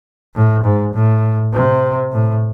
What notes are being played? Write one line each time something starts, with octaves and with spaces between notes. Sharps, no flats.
A2
G#2
A2
C3
A2